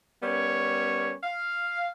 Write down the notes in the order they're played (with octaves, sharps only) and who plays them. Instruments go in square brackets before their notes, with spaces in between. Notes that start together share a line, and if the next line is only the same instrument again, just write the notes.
[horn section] G3 B3 C#4 A#4 C#5
F5